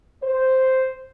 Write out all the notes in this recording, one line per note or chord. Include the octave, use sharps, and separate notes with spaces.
C5